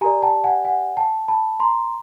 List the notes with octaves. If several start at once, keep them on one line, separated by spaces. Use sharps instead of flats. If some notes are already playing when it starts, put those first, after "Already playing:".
G4 A#4 D5 G#5 A#5
G5 A5
F#5 G#5
F#5 G#5
G5 A5
A5 B5
A#5 C6